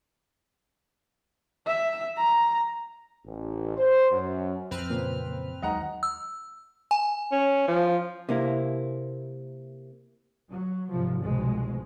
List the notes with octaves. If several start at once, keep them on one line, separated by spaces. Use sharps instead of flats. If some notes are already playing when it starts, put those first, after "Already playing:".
E5
A#5
A1
C5
F#2
F2 F3 F#3 C4 B4 F6
A#2 C#3 A#3
D#2 F#3 G#3 D#4 D#5 F#5 A#5
E6
G#5
C#4
F3
C3 A#3 E4
F#3
G#1 C3 F3
F1 C2 F2 B2 G#3